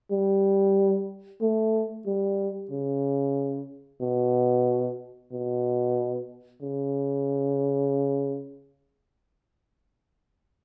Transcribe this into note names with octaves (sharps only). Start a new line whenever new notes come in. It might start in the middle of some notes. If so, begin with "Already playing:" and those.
G3
A3
G3
C#3
B2
B2
C#3